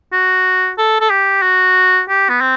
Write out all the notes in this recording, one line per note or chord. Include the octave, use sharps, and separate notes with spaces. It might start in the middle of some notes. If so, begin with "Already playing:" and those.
F#4
A4
A4
G4
F#4
G4
B3
C4